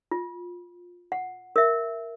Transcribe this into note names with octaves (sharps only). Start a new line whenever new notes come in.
F4
F#5
A#4 E5